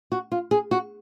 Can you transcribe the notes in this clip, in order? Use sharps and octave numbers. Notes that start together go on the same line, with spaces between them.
F#4
F4
G#4
F#4